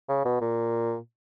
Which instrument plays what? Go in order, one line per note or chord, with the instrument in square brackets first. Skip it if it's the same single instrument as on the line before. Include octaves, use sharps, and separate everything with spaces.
[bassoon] C#3
B2
A#2